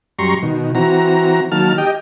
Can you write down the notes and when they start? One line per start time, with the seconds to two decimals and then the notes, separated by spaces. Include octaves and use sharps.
0.19 F#2 G3 A#5 C6 C#6
0.43 B2 D#3
0.75 E3 C4 F#4 A#5
1.52 D#3 F#3 A#3 A5 F6
1.78 G4 D#5 G5